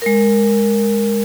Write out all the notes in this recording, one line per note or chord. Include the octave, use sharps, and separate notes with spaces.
G#3 A#4